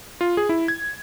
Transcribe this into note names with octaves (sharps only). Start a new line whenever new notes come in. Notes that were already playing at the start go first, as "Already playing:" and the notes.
F4
G#4
E4
G#6